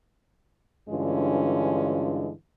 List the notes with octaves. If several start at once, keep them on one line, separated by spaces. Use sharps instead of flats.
G2 D3 E3 G#3 C#4 F4